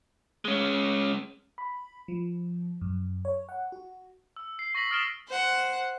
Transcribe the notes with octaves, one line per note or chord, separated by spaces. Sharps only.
G#3 C#4
B5
F3
F#2
C#5
F#5
F#4
E6
C7
C#6 A#6 B6 F#7
D#6 F6 A6 D7 E7 G7
C5 F#5